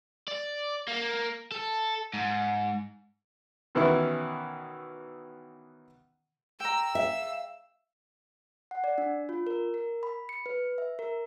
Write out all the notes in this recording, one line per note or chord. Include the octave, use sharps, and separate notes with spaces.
D5
A#3
A4
G#2
B2 D#3 E3 B3 C#4 E4
G5 A#5 E6
E5 F5
F#5
D5
D4
F4
A#4
A#4
B5
C#7
B4
E5
A#4